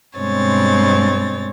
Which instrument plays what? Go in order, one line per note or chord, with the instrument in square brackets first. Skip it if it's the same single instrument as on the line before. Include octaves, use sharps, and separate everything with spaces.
[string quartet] G2 B2 G#3 C4 C#5 A6